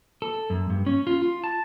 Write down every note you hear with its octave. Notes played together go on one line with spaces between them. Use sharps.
A4
F#2
G2
C#4
F4
F4
A5